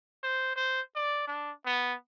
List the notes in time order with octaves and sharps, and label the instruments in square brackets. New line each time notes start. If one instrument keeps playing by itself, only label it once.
[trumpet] C5
C5
D5
D4
B3